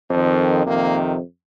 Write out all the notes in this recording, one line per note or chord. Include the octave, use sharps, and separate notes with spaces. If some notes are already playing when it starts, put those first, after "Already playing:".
F2 D#3
F2 C3 D#3 A#3